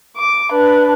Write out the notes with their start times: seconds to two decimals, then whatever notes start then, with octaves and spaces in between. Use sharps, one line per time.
0.16 D6
0.51 D4 B4